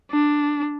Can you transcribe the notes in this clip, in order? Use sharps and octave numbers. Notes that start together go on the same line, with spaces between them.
D4